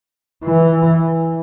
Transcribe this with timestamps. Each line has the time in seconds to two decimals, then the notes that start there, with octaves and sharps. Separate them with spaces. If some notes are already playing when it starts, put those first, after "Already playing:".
0.44 E3